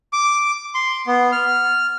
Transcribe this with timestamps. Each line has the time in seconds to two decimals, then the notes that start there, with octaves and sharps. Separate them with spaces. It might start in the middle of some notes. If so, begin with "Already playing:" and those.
0.13 D6
0.75 C6
1.07 B3
1.32 F6